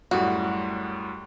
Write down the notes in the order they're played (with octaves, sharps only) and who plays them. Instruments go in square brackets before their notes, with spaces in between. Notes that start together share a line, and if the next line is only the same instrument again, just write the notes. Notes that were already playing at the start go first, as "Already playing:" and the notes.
[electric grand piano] F#2 A2 G3 [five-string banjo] F#4